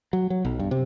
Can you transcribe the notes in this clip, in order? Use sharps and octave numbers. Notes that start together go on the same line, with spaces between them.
F#3
F#3
B1
G2
C3